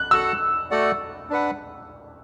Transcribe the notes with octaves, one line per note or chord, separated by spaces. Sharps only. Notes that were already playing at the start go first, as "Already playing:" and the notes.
Already playing: F#6
F#4 A4 F#5 E6
A3 F#4 A4 D5 F#5
D4 B4 F#5